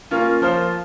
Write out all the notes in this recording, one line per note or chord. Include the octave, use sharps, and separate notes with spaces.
A#3 C#4 F4
F3 A#3 F4 C5